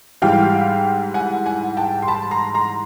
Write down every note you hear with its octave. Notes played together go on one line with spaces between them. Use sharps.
G#2 E3 G3 F5 G5
F#5 G#5
F#5 G#5
G5 A5
C6
A5 B5
A#5 C6
A#5 C6